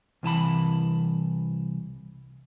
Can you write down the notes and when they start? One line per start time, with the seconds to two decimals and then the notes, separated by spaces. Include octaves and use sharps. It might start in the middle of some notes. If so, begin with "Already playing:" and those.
0.23 C2 E3 A5 B5